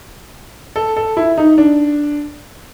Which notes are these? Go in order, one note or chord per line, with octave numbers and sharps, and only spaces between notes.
A4
A4
E4
D#4
D4